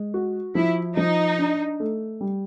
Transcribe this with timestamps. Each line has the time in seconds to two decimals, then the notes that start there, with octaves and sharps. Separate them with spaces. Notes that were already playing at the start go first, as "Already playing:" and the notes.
Already playing: G#3
0.14 F#4
0.55 F3 E4
0.97 F3 D#4
1.39 D4
1.80 A3
2.21 G3